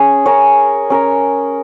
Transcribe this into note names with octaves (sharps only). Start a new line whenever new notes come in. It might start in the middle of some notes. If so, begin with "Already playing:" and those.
Already playing: C#4 G#4 C#5
C#4 A#4 C#5
C#4 A#4 C#5